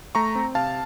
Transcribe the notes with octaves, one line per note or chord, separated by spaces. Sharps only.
A3 A#5 C#6
C4
C3 F5 A5